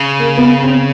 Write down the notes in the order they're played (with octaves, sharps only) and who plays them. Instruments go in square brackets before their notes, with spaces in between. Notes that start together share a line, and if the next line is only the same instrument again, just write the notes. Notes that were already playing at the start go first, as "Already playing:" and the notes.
Already playing: [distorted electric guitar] C#3
[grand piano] A#3
B3
C4